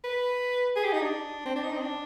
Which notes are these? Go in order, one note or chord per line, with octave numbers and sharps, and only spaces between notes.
B4
G#4
G4
D#4
D4
C4
D4
D#4
C4
D4